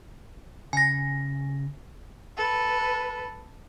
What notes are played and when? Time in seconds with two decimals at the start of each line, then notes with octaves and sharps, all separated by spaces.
0.73 C#3 G#5 A#6
2.37 A4 B4